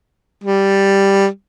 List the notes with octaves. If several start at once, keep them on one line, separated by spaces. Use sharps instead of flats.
G3